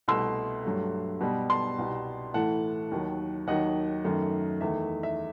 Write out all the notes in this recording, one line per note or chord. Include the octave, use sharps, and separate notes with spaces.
C2 B2 A3 C6 E6
G2 F#3 A3
B2 G3 B3
A5 C6
C2 B2 G3
A2 E3 A3 F#5 A5
D#2 D#3 F#3
D#2 D#3 F#3 D#5 F#5
F#2 D#3 A3
E2 D#3 A3 E5
E5